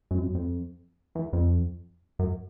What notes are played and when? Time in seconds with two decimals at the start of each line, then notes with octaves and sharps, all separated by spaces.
0.11 F#2
0.18 F2
0.23 F#2
0.35 F2
1.15 E2
1.33 F2
2.19 F#2